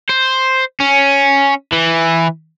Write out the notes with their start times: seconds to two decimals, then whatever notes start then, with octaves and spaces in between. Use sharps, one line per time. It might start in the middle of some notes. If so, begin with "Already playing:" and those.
0.10 C5
0.80 C#4
1.72 E3